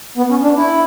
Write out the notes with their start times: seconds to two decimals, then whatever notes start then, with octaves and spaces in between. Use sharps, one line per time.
0.17 B3
0.30 C#4
0.43 D4
0.57 E4